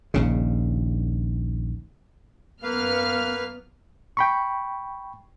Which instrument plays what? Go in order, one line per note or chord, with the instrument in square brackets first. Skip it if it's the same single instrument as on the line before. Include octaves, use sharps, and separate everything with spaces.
[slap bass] A#1 D#2 C#3
[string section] F#2 B3 F6 [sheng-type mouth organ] A#3 B4 F5
[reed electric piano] G5 B5 C#6